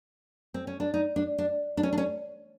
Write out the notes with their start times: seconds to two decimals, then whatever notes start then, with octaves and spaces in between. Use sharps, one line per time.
0.54 C4
0.67 C#4
0.80 D4
0.94 D#4
1.16 D4
1.38 D4
1.77 D4
1.83 C#4
1.93 D4
1.98 C#4